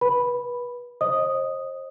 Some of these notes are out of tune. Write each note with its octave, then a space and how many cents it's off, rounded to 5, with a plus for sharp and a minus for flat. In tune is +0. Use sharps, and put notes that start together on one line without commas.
B4 -25 B5 +0
C5 +35 D#5 +0 D#6 +0